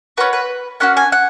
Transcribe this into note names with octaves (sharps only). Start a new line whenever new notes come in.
C#4 F#4 B4
B4
A#3 C#4 F#4 F#5
G#5
F#5